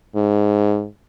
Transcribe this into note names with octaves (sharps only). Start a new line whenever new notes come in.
G#2